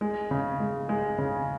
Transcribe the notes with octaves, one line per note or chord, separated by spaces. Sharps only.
G#3
C#3
G#3
G#3
C#3